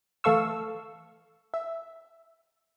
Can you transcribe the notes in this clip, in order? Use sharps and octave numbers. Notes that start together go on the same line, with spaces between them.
E3 A3 A4 F5 C#6 E6
E5